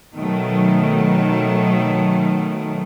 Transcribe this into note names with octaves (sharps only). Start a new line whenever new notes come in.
B2 D#3 F#3 A3